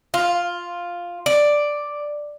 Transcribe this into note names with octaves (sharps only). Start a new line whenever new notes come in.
F4
D5